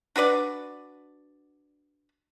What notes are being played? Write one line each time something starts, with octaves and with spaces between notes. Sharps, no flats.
D4 F#4 B4 D5